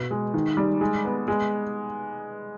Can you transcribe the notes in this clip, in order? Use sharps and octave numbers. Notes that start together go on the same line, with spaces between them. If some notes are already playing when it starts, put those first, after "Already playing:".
Already playing: B2
G#3
D#3
G3
G#3
B3
G#3